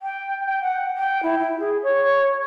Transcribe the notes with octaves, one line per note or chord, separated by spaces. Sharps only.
G5
G5
F#5
G5
E4
E4
G#4
C#5